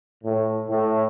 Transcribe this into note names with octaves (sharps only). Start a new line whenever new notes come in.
A2
A2